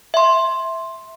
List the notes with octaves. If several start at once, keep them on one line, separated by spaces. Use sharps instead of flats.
E5 C6